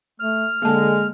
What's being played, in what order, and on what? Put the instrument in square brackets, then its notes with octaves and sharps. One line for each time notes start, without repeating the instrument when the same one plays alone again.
[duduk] A3 [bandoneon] F6
[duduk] D3 [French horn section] G#3 [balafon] A#3 A5